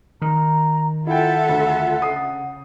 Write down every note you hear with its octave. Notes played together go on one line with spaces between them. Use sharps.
D#3 A#5
E4 F4 A4 E5 F#5 G5
D2
C#3 D#6 C7